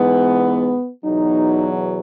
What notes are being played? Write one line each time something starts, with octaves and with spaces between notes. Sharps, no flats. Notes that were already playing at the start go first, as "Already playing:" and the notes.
Already playing: G#2 E3 B3
E2 B2 F#3 D#4